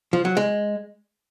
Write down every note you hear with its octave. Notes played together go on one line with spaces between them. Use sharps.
F3
F#3
G#3